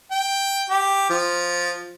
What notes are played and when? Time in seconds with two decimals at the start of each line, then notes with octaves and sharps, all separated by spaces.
0.11 G5
0.69 G4
1.09 F3